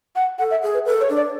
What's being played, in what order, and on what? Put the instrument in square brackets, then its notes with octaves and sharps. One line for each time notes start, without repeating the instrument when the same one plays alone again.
[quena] F#5
[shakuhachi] A4 [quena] F#5
[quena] E5
[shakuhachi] G#4
[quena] B4
[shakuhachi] A4 [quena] B4
[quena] C#5
[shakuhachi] D4
[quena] D5